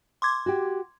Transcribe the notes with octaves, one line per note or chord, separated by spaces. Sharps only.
C6 D6 G#6
F#4 G4